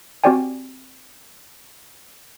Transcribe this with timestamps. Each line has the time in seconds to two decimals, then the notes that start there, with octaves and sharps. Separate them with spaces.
0.24 C4 F#4 G4 D5 G5 G#5